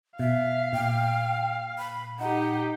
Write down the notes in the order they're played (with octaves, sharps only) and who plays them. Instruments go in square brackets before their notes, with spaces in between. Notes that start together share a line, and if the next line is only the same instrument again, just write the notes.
[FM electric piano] B2 [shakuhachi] E5 [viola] F5
[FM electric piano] A#2 [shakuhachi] G5
[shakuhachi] B5
[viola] D#4 G4 [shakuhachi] F#5